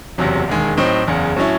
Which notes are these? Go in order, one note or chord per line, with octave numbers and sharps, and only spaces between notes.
F#1 E2 C3 F#3
E1 D#2 D#3 G#3
A2 F#3 C4 D#4
F#1 E2 C#3
A2 F#3 C#4 E4